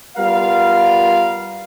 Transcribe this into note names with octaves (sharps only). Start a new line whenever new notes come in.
G3 B3 F4 A#4 F5